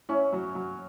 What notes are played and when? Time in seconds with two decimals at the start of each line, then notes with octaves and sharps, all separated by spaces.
0.09 C#4 E4
0.32 F#3
0.55 F#3